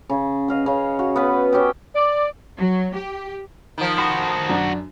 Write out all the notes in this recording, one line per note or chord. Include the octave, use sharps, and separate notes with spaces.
C#3 C#5
D#5 F5 F#5
C#3 C#5
F#4
B3 C#4 B4
C#4 G4 E5 G5
D5
F#3
G4
D#3 F3
F#4 C5 B5
A#5
F#2 D4 A#5